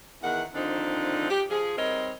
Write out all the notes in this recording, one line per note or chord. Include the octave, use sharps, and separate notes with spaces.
E2 D#3 F#5
D3 D#3 F3 C4 D4 D#4
G4
F3 G#4
G3 C4 D#4 A#4 C#5 D#5